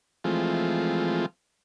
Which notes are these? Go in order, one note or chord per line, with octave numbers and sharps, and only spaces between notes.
E3 F3 G#3 A3 C4 F4